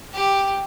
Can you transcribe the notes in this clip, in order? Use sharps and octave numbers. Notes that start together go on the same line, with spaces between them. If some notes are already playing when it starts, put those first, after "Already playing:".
G4